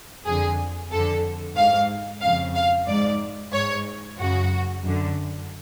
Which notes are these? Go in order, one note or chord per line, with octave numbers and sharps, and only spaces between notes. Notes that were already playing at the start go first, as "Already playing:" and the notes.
F2 D3 G#4
F2 D3 A4
G#2 F5
F2 C#3 F5
F5
G#2 D5
G#2 C#5
F#2 C#3 F#4
F#2 D3